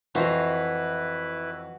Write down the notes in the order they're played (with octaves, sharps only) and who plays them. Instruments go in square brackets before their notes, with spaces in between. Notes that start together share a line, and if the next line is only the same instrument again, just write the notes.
[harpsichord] F2 [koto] E3 C5 A#5 [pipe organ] E4 B4 [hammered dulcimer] F#4